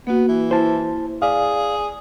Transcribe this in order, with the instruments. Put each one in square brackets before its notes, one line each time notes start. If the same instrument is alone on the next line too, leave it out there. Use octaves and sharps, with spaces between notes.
[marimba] A#3 F#4 [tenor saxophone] B3
[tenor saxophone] E3
[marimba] E4 G#5 [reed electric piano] C5 A5
[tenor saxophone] G#4 [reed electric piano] D5 F5